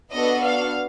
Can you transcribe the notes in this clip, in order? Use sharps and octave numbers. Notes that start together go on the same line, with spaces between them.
B3 D4 F#4 A4 D#5
F5